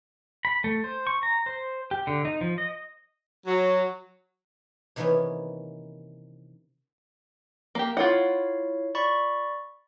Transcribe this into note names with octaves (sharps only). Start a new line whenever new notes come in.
B5
A3
C5
C#6
A#5
C5
G4
D3
D#4
F3
D#5
F#3
C3 D#3 E3 A#3 B3 C#4
A#3 G4
E4 F4 C#5 F5 F#5
D5 B5 C#6